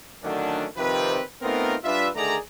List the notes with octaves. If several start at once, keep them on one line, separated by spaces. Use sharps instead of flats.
D3 D#3 F#3 A3 C#4 D4
C3 D#3 F3 C4 G4 B4
A3 B3 C4 D#4 F4 A#4
G3 D4 F4 B4 E5
D3 D#3 A3 G#4 D5 A#5